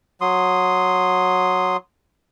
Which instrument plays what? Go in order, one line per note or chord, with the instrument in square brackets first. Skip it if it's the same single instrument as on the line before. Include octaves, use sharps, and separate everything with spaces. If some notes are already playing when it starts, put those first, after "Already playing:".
[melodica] F#3 C6 D#6